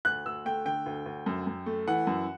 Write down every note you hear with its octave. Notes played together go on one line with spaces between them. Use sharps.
D2 F#6
D2 E6
A3 G5
D3 G5
D2
D2
F#2
F#2
A3
E3 F#5
F#2